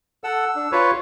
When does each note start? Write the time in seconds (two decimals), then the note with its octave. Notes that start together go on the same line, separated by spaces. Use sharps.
0.24 A4 F#5 E6
0.56 D4
0.72 F4 B4 C#5 F5